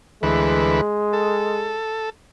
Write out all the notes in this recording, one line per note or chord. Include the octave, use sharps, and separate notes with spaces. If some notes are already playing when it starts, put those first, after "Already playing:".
D2 E3 G#3 B4
A4